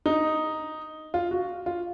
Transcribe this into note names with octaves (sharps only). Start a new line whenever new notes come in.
D#4
F4
F#4
F4